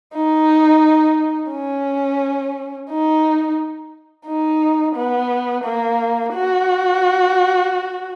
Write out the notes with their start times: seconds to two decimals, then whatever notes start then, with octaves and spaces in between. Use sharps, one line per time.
0.14 D#4
1.52 C#4
2.90 D#4
4.27 D#4
4.96 B3
5.64 A#3
6.34 F#4